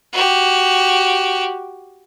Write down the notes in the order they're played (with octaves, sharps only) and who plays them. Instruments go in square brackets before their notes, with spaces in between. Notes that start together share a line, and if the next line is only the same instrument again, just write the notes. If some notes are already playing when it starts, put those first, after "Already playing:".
[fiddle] F#4 G4